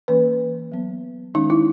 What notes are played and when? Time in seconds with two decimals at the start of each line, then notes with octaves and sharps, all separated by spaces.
0.08 E3 A#3 C#4 B4
0.72 F#3 B3
1.34 D#3 G#3 C#4 D#4
1.50 E4